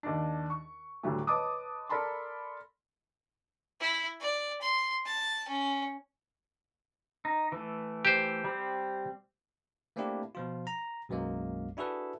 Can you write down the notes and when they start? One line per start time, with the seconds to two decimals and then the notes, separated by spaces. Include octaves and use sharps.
0.03 D#2 D4
0.50 C#6
1.03 D2 A2 F#3 G3 A3
1.27 B4 C#5 D#5 A5 D6 D#6
1.89 A4 A#4 D5 A5 B5 C6
3.80 E4
4.21 D5
4.61 C6
5.06 A5
5.48 C#4
7.25 D#4
7.52 E3 A3
8.05 G4 C5
8.44 G3 C4
9.96 A3 A#3 C4 D4 E4 G4
10.35 B2 F3 F4
10.67 A#5
11.09 B1 F#2 F#3 G#3 A#3
11.77 D4 E4 F#4 G#4 A4 B4